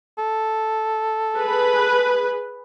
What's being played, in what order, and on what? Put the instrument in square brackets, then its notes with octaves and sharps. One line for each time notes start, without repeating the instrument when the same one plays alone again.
[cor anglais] A4
[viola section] G#4 B4